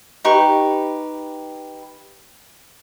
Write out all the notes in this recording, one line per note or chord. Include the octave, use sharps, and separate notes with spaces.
D#4 G4 B4 C#6